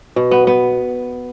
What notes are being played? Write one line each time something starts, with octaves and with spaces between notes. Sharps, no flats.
B2
B3
B3